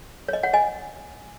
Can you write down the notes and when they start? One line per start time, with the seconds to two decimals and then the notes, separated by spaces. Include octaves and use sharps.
0.28 C#5
0.33 D#5
0.43 C#5 F#5
0.53 D#5 G#5